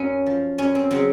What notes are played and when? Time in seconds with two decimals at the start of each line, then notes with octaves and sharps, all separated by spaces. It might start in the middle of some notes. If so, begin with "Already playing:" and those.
Already playing: F#2 C#4
0.26 F3
0.58 F#2 C#4
0.75 C4
0.91 C#3 F#3 C4